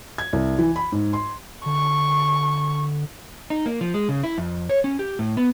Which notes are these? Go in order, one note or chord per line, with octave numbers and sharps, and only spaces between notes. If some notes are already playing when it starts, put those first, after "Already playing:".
G#6
C2
E3
B5
G#2
C6
D3 C#6
D#4
A#3
F3
G#3
C#3
E4
F2
C#5
C#4
G4
A2
B3